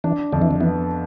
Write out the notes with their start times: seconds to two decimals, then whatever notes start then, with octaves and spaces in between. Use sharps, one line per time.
0.04 E3 D4
0.33 F2 D3
0.42 E3
0.51 D3
0.60 E3 B3